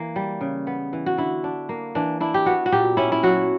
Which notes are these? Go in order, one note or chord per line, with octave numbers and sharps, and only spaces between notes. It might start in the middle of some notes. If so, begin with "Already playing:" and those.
Already playing: E3 A#3
G3
C#3
B3
E3
F#4
D3 E4
D4
A#3
E3 D4
D4 E4
G4
B3 F#4
F#4
A#2 G4
C#4 E4
E4
F#3 F#4